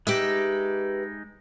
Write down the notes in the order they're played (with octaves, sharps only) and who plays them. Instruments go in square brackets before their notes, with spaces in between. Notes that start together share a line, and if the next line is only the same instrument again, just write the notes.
[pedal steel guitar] G#3 D#4 [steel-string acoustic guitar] G4 B4 E5